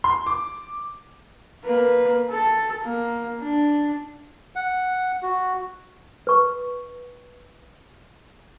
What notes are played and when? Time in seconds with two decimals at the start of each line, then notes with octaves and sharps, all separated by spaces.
0.04 C6
0.26 D6
1.64 A#3 B4
2.30 A4
2.84 A#3
3.40 D4
4.56 F#5
5.23 F#4
6.27 B4 C#6